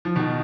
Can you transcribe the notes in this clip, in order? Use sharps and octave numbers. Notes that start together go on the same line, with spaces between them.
F3
B2 D#3